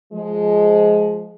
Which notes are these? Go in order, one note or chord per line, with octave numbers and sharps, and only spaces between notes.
F3 G#3